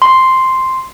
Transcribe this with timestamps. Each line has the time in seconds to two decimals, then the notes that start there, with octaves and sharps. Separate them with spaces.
0.02 C6